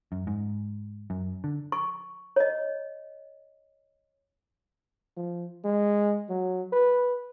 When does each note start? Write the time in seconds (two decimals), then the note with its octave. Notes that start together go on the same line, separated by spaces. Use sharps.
0.12 F#2
0.27 G#2
1.10 F#2
1.44 D3
1.72 C#6
2.36 C#5 D#5
5.17 F3
5.64 G#3
6.29 F#3
6.72 B4